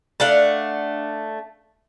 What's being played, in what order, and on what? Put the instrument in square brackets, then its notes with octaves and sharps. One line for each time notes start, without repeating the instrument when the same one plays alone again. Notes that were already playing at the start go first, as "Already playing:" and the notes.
[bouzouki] A3 D4 F5 F#5